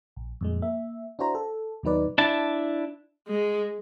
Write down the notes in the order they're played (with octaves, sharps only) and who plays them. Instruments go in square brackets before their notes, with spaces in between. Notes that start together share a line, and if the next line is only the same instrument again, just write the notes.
[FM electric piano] A#1
F2 A#2 G#3
A#3 E5
D4 E4 F#4 C5 A#5
A4
D#2 B2 F#3 D#4 B4 D5
[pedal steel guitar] D4 E4 A5
[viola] G#3